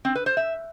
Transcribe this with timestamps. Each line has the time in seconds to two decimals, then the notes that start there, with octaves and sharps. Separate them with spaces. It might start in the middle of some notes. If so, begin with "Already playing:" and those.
0.05 C4
0.15 B4
0.26 C5
0.37 E5